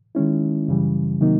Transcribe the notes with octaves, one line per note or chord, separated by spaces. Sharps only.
D#3 G#3 C#4 E4
F#2 C#3 E3 G3
C3 D#3 F#3 A#3 D#4